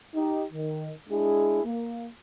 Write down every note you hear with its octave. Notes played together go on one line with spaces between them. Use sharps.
D#4 G4
D#3
G#3 D4 E4 G#4
A#3